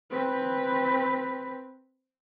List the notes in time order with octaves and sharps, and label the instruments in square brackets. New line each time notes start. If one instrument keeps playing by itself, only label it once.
[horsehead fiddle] C4 B4